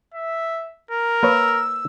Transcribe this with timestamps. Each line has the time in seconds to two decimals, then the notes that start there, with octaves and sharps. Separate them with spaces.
0.14 E5
0.91 A#4
1.23 A#3 B4 C#5 E6